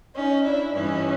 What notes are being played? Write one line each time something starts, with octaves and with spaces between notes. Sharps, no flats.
C#4 D#4
D4 E4
G2 E3 C#4 D#4